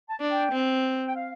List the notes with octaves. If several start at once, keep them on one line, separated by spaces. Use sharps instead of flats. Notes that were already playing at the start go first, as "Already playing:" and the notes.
A5
D4
G5
C4
G5
F5